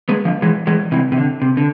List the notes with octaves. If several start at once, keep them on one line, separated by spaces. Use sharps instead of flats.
G#3 B3
D3 F3
E3 G#3
E3 G#3
C3 E3
C3
D3
C3
D3